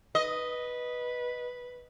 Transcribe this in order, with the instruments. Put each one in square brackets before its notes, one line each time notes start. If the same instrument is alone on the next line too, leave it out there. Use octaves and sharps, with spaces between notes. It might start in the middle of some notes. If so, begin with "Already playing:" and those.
[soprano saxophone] B4 [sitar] D#5